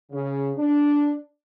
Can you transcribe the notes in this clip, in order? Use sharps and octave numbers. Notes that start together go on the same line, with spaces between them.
C#3
D4